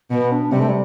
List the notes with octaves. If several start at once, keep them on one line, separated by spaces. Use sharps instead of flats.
B2 B3
D4
C3 G3
A3
G3